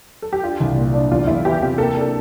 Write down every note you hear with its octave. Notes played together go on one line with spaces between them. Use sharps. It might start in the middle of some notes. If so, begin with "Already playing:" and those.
A4
G4
D4 F4
C2
A#2
D4
E2 F4
E2 E4
E3 G4
C3 G4
A#3 A4
D4
A4